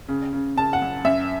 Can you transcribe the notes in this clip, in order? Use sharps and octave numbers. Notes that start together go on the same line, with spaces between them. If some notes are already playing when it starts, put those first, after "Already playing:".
C#3
C#3
C#3 A5
F#5
F#2
F#2 E5